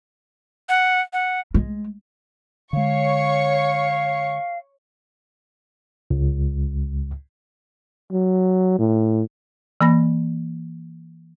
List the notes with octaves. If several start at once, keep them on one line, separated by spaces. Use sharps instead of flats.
F#5
F#5
G#3
D3 G#3 C#5 F5 C#6
C#2
F#3
A2
E3 A#3 B5 A#6